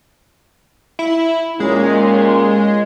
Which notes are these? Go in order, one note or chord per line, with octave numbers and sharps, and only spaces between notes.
E4
D#2 A#2 G#3 C#4